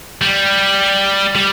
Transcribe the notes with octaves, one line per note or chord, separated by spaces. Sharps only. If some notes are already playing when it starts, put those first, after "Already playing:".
G3
G3